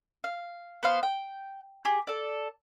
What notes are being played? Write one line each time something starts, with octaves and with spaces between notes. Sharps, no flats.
F5
B3 C5 F5
G5
G4 G#4
A4 D5